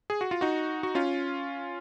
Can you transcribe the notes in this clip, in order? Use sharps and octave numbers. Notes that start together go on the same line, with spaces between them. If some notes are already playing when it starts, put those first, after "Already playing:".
G#4
F#4
F4
D#4 F#4
F#4
C#4 F4